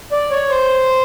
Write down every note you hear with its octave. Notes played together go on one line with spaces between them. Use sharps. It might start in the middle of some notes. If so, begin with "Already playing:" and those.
D5
C#5
C5